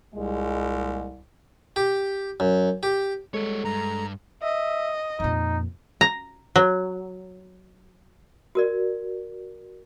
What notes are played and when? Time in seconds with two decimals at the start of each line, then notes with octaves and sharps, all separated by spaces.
0.14 C2 A#2 G3 G#3
1.76 G4
2.40 F#2
2.83 G4
3.34 G3 G#3 A4 C#5
3.65 G2 A#5
4.43 D#5 E5
5.20 F2 A#2 D#4
6.01 A#5
6.56 F#3
8.55 F#4 A#4 D5